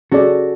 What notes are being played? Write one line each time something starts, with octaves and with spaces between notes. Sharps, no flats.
C#4 F#4 G#4 A4 D5